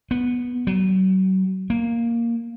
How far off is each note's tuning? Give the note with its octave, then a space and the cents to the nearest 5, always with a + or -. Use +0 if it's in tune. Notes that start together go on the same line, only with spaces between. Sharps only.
B3 -10
F#3 +35
A#3 +0